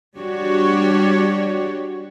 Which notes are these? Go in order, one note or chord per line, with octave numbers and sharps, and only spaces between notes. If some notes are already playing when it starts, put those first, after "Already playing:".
G3 D4 F#4 G4 C#5